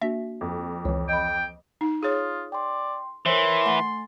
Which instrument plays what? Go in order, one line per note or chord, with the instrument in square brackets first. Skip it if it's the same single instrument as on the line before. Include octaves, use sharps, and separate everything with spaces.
[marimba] A#3 D4 F#4 [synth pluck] E5
[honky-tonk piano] F2
[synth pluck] C#2 E3 [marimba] C#5
[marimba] D#5 B5 [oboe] G5
[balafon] D#4
[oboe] F4 [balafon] G#4 C#5 [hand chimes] D#6
[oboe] D5 [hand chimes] G5 C6
[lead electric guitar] E3 [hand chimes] A#4 C#5 [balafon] C5 [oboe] C6
[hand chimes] A3 G#5 A6 [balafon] F#5